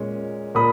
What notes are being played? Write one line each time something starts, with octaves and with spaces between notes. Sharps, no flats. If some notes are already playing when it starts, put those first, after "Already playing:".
Already playing: A#2 G#3 C#4
A#2 A#3 B5 D#6